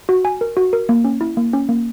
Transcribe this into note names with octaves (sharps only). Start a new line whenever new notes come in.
F#4
G#5
A#4
F#4
A#4
A#3
C#4
E4
A#3
C#4
A#3